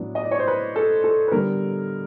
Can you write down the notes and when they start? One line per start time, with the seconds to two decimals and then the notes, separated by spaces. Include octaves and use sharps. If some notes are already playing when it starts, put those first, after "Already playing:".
Already playing: A2 F#3 B3 D4
0.15 D#5
0.23 D5
0.31 C#5
0.39 C5
0.47 B4
0.76 A4
1.04 A4
1.28 B4
1.32 D3 G3 B3 A#4